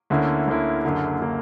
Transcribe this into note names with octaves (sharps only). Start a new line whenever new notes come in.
D2 D3 A#3 C#4 E4
D2 D3 A#3 C#4 E4
F#1 F#2 D3 A#3
D3 A#3